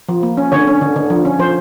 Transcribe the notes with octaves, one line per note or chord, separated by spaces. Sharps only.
F3
A#3
C#4
D3 C#5
C#4
D3
D3
F3
C#4
F3 C5